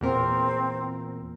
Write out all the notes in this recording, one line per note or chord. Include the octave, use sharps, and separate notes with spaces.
E2 A#2 C4 A#4